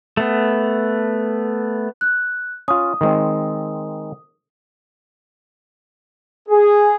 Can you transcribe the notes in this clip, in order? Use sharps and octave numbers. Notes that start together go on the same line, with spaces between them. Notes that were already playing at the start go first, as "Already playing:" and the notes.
A3 B3
F#6
C#4 F4 D#6
D#3 G#3 C4
G#4